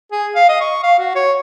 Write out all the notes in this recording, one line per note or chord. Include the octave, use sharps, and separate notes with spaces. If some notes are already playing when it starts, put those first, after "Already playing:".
G#4
F5
D#5
C#6
F5
F#4
C#5